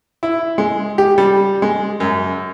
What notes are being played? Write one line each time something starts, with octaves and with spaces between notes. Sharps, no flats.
E4
G#3
G4
G3
G#3
F#2